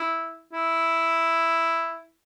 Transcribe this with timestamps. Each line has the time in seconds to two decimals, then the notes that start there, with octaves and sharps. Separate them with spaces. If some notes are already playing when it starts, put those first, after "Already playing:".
Already playing: E4
0.53 E4